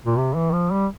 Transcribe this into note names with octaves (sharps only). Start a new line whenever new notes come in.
A#2
C3
E3
F3
G3